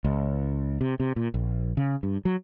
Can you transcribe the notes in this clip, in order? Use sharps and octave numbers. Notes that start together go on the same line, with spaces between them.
C#2
C3
C3
A#2
A#1
C#3
G2
F#3